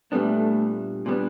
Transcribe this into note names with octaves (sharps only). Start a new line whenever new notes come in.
A#2 G3 A3 B3 D4
A#2 G3 B3 D4